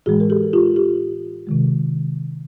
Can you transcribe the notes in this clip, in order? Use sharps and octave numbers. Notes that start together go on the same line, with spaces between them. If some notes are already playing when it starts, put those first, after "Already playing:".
A2 E3 G#3 F#4 G#4
A#4
G4 A4
F4 G4
F4 G4
C3 D#3 G#3